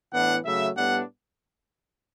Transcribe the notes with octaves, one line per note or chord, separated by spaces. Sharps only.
A2 E3 B3 D4 F#5
C#3 F#3 A3 E5
A2 G3 B3 D4 F#5